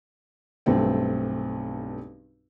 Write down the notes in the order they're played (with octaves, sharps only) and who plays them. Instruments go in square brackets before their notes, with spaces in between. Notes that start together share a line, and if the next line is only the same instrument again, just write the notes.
[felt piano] B1 G2 A3 C4